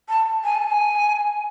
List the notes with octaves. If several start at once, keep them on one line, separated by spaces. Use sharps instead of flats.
A5
G#5
A5
A5
G#5